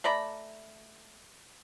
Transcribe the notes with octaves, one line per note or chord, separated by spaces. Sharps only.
A3 D5 A#5 B5